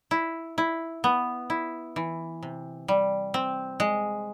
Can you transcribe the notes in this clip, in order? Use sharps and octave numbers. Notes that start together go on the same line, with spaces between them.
E4
E4
B3
E4
E3
C3
G3
C4
G#3